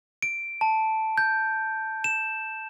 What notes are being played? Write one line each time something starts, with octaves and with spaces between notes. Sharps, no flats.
D7
A5
G6
E7